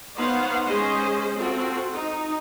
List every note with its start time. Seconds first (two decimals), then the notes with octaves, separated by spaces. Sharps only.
0.17 B3 D#4 C5 C#5 F5 F#5
0.66 G#3 C#4 G#4 C5 C#5 D#5
1.36 C4 F4 F#4 A4
1.93 D#4